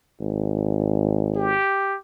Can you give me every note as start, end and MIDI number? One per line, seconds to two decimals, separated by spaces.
0.20 1.53 32
1.36 1.97 67